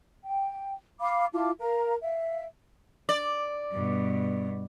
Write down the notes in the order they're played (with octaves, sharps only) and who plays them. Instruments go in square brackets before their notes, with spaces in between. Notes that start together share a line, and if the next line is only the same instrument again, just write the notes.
[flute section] G5
F5 B5 D6
E4 F4 A5 D6
A#4 F5 A#5
E5 F5
[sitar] D5
[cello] G2 B2